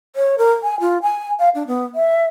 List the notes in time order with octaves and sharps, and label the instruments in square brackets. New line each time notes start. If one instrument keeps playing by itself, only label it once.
[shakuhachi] C#5
A#4
G#5
F4
G#5
F5
D4
B3
E5